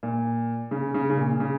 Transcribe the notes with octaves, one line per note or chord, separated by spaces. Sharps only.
A#2
C#3
C#3
C#3
A#2
C#3